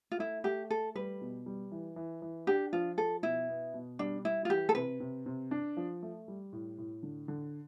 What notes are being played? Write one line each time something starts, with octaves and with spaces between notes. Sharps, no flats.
F4
A3 E4
A3 G4
A3 A4
G3 B4
B2
G3
E3
E3
E3
D4 G4
F3 F4
F3 A4
B2 E4
B3
B2
G3 D4
G3 E4
F4
E3 G4
A4
C3 B4
C3
C3
D4
F3
A3
G3
A2
A2
D3
D3